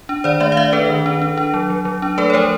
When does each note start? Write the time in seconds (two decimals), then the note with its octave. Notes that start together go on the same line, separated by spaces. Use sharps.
0.09 D4
0.24 D#3 C5 D5
0.40 A3 D5 E5
0.52 F5
0.56 D4 D5 E5
0.73 D4 A4 B4
0.89 D#3
1.06 D4
1.22 D4
1.38 D4
1.54 F#3
1.70 F#3
1.85 F#3
2.02 D4
2.18 A3 A4 B4
2.30 C#5
2.34 F3 A#4 C5